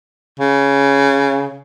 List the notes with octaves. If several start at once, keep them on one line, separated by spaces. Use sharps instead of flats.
C#3